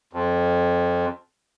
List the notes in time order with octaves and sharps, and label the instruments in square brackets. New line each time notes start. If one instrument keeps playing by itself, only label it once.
[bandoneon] F2